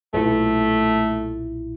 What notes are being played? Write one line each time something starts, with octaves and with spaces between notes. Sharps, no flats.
B1 A#2 A3 E4